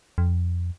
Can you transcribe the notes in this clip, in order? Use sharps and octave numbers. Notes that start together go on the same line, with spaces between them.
F2